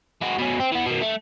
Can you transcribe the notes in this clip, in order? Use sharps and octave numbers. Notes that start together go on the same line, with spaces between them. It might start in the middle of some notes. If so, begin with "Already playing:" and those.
G#3 F#4
B2 C#4
C4
E3 B3
B2 D#3
A3